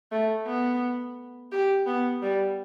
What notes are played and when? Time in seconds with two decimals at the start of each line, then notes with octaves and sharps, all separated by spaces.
0.12 A3
0.46 B3
1.52 G4
1.86 B3
2.22 G3